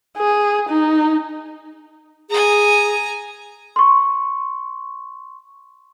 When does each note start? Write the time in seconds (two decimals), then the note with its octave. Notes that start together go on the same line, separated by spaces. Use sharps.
0.17 G#4
0.69 D#4
2.30 G#4 G#5 A#5
3.76 C6 C#6